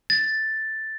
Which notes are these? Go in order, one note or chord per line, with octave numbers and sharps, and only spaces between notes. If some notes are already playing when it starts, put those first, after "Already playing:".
A6